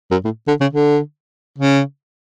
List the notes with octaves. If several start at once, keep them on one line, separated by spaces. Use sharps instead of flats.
F#2
A2
D3
C#3
D3
C#3